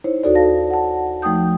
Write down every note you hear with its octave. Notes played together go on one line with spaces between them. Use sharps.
D#4 E4 C5 C#5
D#2 D#4 F#4 A4 D5
F5 A5 A#6
F#5 A5
F3 A3 D#4 G5 D#6 G6
A3